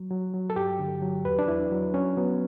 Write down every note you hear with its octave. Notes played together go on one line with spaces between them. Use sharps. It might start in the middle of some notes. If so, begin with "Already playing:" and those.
Already playing: F#3
F#3
F#3
A4
G2 G4
D3
F#3
E2 B4
D4
E2 E4
F#3
F#3 C#4
F#3 B3